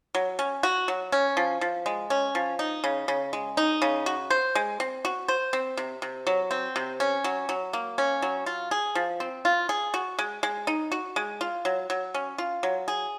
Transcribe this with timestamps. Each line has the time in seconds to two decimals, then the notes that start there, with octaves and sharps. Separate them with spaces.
0.15 F#3
0.39 C#4
0.63 F#4
0.88 F#3
1.12 C#4
1.37 F3
1.61 F3
1.86 G#3
2.10 C#4
2.35 F3
2.59 D#4
2.84 C#3
3.08 C#3
3.33 G#3
3.57 D#4
3.82 C#3
4.06 F#4
4.30 C5
4.55 G#3
4.80 C4
5.05 F#4
5.28 C5
5.53 C4
5.77 C3
6.02 C3
6.27 F#3
6.51 C4
6.76 C3
7.00 C#4
7.24 F#3
7.49 F#3
7.73 A#3
7.98 C#4
8.22 F#3
8.46 F4
8.71 G#4
8.95 F3
9.20 C4
9.45 F4
9.69 G#4
9.94 F#4
10.19 G#3
10.43 G#3
10.67 D#4
10.92 F#4
11.16 G#3
11.41 F4
11.65 F#3
11.90 F#3
12.14 C#4
12.38 F4
12.63 F#3
12.88 G#4